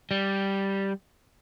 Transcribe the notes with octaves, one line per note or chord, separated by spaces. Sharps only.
G3